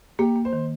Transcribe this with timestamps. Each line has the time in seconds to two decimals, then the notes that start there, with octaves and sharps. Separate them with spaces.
0.19 A#3 G4
0.36 A#3
0.45 C5
0.53 D#3